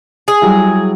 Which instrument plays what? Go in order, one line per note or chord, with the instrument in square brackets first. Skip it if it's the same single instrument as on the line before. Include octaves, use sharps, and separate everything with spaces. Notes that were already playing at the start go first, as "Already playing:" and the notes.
[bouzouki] G#4
[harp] F#3 G3 E4